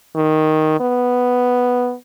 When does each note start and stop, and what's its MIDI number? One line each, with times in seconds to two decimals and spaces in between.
0.15 0.76 51
0.80 1.94 59